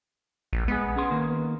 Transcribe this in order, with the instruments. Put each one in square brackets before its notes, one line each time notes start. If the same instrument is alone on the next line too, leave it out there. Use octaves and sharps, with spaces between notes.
[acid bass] A#1
[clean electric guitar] G#3 G#4 [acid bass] B3
[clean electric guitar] C#4 G#4 C6
D#3 A#3